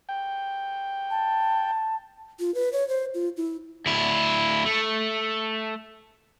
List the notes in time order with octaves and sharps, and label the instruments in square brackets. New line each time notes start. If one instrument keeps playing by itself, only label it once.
[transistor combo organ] G5
[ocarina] A5
F4
B4
C#5
C5
F4
E4
[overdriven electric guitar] D2 E4
A3